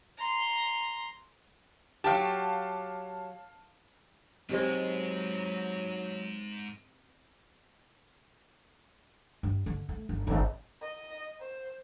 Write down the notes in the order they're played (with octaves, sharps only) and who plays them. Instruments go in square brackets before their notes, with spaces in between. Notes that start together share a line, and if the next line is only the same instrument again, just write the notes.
[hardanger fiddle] A#5 C6
[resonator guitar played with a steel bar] F#3 G4 [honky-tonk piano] F5 A5
[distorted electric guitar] G#2 [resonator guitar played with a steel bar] B2 G#3 [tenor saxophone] F#3 [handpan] C4 G4 C5
[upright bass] G2
D3
A3
G1
G#1 A2
[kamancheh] D#5
C5